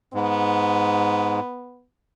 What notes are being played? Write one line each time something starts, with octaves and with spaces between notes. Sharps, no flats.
G#2 B3